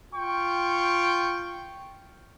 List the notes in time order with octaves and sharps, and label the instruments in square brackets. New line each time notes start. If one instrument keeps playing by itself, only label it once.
[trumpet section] F4 G5 C#6